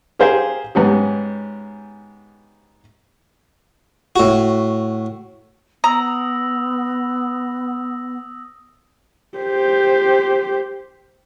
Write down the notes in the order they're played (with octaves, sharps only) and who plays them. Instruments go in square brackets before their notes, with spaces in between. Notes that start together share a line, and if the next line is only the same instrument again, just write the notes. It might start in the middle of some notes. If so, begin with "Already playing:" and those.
[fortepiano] G4 G#4 A#4 C5 F5 G#5
G#2 B3 C#4 G4
[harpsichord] A2 F#4
[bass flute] B3 [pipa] A#5 [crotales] D#6 E6 A#6
[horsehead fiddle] G4 C5